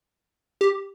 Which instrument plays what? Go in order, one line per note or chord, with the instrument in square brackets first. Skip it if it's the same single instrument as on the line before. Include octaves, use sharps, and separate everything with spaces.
[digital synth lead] G4